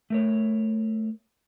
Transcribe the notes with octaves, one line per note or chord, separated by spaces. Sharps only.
A3 A#4 C#5